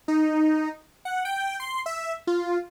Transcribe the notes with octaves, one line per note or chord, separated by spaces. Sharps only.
D#4
F#5
G5
C6
E5
F4